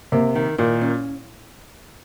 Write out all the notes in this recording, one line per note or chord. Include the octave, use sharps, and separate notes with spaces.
C3 A#3
D#3
A#2 D#3
C#4